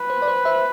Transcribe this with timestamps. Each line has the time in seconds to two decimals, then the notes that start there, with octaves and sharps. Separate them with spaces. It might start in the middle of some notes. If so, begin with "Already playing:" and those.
Already playing: B4
0.10 C5
0.22 D5
0.28 C5
0.45 C5 E5